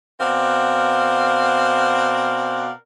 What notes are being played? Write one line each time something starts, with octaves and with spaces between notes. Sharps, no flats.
B2 C4 A#4 D5 F5 F#5